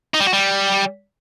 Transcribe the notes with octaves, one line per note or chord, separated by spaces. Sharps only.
D#4
G3
F#4
G3